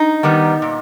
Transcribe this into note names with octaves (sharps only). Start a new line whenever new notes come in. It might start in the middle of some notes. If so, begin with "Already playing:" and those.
Already playing: D#4
D#3 G3 B3
A#2